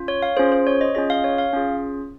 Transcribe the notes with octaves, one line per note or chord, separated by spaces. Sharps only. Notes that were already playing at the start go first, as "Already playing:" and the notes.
Already playing: C#4 F4
C#5
F5
C#4 F4 G#4 C5
C5
C#5
D#5
C#4 F4 G#4 D#5
F5
C#5
F5
C#4 F4 G#4